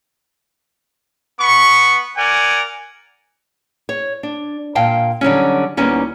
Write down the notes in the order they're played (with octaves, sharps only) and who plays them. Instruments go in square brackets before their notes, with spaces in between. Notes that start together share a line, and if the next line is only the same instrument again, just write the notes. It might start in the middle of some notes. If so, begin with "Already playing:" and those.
[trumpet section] B3 B5 C#6
A#4 D5 F#5 G#5
[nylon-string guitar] C#5
D4
A#2 F5 G5 A5
D3 F#3 G3 C#4
D2 G3 A#3 B3 C#4 D#4